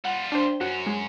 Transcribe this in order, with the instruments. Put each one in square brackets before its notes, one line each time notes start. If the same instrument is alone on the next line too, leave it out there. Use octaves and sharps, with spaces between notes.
[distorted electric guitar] G3 F4 [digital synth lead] F#5
[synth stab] D4 C5 [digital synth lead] G5
[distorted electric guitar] F#2 C#4 [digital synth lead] F#4
[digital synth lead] G#3